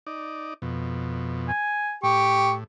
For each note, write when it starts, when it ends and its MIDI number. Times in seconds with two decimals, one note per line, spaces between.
0.07 0.54 63
0.07 0.54 74
0.62 1.52 41
0.62 1.52 47
1.49 1.95 80
2.03 2.64 45
2.03 2.54 67
2.03 2.53 85